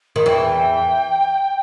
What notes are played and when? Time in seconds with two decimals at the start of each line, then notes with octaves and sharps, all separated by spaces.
0.16 D#3
0.26 E2 E3 G5